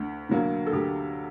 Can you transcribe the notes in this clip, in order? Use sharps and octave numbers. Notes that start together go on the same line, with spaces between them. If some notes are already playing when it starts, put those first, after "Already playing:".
Already playing: D2 D3
D3 F#3 A#3
A4
D2 G4